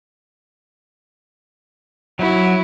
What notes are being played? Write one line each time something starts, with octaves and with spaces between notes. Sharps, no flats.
F#3 E4 F#4